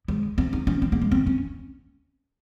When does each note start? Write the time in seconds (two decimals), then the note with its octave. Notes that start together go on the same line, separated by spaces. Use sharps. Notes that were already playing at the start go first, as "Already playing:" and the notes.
0.08 G#3
0.38 C4
0.53 D#4
0.67 C#4
0.82 C4
0.92 A#3
1.02 G#3
1.12 C4
1.27 C#4